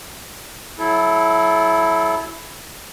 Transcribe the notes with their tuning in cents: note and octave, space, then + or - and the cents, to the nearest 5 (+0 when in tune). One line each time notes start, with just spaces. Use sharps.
F#3 +0 E4 +0 A4 -35